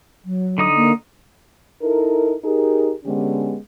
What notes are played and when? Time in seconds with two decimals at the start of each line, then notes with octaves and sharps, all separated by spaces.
0.25 F#3
0.58 D3 D#4 D#6
0.75 A#3
1.82 D#4 E4 A4 A#4
2.44 D#4 G4 G#4 A#4
3.05 D3 G#3 B3 C#4 G4